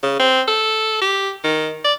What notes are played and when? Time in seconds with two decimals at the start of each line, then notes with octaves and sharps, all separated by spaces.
0.03 C#3
0.19 C4
0.47 A4
1.01 G4
1.44 D#3
1.84 D5